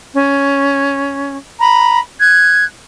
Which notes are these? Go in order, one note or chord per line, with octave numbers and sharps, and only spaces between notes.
C#4
A#5 B5
F#6 G#6